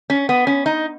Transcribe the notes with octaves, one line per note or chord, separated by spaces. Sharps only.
C#4
B3
C#4
D#4